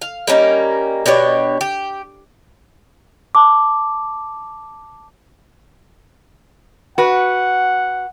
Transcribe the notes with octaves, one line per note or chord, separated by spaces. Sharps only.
F5
G3 A#3 C#4 D#4
B2 D4 G4 C#5
G4
A5 D6
F#4 B4 F#5